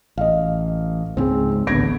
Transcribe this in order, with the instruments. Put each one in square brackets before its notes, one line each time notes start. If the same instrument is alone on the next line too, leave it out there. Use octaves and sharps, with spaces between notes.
[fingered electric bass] A1 [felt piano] D#5 F5
[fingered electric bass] C#2 G#2 [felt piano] C4 G#4
[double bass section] A1 B3 [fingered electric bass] D2 D3 [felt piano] G#6 A#6 D7